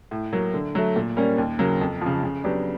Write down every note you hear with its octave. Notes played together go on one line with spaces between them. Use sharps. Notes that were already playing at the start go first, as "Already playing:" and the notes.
A2
F#3 A#3
D3
F#3 A3
A#2
G3 A#3 C#4
D#2
C#3 F#3 A#3
F2
C#3 F3
C#3
F#3 B3 D4 G4